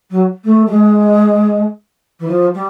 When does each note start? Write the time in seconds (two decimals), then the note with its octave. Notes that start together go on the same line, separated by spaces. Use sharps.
0.10 F#3
0.44 A3
0.66 G3
0.70 G#3
2.19 E3
2.27 F3
2.54 G3